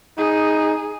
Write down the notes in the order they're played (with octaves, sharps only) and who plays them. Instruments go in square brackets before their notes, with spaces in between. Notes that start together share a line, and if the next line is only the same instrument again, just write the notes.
[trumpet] D#4 [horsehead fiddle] G#4